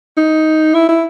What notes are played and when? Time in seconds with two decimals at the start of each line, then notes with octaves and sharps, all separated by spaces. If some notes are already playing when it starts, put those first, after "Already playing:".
0.17 D#4
0.74 E4
0.89 E4